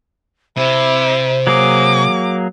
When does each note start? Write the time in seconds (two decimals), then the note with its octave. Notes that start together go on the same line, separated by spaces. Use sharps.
0.57 C3 E4 C5
1.47 F#3 A#3 G#4 D6